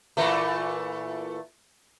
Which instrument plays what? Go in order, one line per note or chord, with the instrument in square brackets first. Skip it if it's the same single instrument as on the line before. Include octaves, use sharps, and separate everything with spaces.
[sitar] A#2 E3 A3